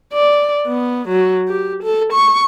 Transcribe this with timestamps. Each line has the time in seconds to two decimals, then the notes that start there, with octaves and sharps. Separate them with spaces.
0.13 D5
0.67 B3
1.08 F#3
1.48 G4
1.83 A4
2.13 C#6